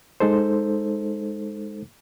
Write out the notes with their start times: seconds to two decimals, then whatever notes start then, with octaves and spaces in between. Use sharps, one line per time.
0.20 G#3 D#4 A4 C5